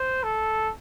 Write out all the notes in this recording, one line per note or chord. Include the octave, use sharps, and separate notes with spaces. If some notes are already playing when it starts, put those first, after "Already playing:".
Already playing: C5
A4